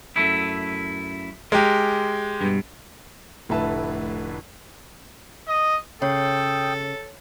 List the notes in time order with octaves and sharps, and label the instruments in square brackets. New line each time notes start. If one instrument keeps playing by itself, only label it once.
[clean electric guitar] F#2 A3 E4
[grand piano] G#3 G4 [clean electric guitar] A#4
[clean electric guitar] G2 B2
[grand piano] F1 A2 D3 B4 E5 A5
[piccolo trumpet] D#5
[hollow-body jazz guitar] C#3 [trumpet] A4 [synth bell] C#5 [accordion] G5 D#6 E6